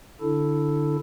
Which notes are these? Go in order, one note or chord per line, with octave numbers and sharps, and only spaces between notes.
D3 D4 E4 A4